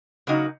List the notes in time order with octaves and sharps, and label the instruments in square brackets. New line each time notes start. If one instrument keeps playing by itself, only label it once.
[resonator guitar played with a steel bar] C#3 F#3 A#3 D#4 F#4